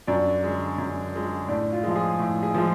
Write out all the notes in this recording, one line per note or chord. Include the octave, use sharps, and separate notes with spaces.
F#2 D4
D3 G#3
F#2
D3 G#3
A2 D4
F4
F3 G#3
G#4
A2
G#4
F3 G#3